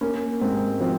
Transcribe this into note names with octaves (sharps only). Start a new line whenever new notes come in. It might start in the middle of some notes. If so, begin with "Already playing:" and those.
A#3 C#4
G#2 C4
F3 C4